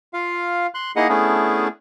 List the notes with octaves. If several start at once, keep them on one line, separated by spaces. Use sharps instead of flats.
F4 F5
C6 F#6
A#3 D#4 E4 G#4 D#5 F#5
A3 B3 C#4 D4 E4 G#4